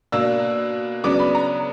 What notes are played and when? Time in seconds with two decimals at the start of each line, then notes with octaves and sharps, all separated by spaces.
0.12 B2 A#3 D4 E6
1.04 C#3 F#3 B3 D4 D6
1.19 B5
1.35 A#5